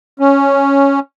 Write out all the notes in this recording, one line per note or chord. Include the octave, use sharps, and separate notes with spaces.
C#4